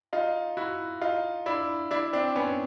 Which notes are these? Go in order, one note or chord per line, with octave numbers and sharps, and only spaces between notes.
D#4 F4
E4 F#4
D#4 F4
D4 E4
D4 E4
C4 D4
B3 C#4